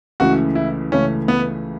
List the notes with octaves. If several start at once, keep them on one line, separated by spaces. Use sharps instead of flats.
C#2 C#3 E3 A3 F#4
E4
C#2 C#3 E3 A3 C#4
B3